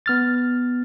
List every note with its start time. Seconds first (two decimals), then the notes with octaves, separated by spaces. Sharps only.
0.06 B3 F6 A6